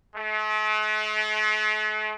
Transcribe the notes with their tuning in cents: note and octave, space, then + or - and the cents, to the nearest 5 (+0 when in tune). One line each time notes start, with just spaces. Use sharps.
A3 -45